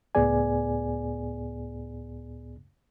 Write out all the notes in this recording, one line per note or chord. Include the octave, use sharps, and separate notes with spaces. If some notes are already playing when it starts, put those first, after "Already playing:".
C#2 A2 B3 G#4 D5 G#5